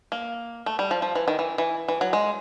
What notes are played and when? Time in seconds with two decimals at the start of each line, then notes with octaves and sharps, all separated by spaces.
0.12 A#3
0.66 A3
0.79 G3
0.91 F3
1.02 F3
1.15 E3
1.28 D#3
1.39 E3
1.58 E3
1.88 E3
2.01 F#3
2.13 G#3